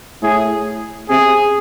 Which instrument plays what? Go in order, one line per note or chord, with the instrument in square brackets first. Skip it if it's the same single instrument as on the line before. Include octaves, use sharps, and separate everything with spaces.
[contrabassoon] A2 [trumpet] G#4
[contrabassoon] C3 [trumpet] G#4